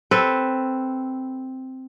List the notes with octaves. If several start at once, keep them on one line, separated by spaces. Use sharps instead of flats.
C4 A4 B4